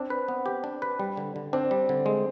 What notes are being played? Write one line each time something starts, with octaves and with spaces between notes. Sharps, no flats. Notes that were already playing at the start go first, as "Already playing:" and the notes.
Already playing: C4 D4
B4
B3
G4
D4
B4
G3
D3
D3
C4 D4
G3
D3
G#3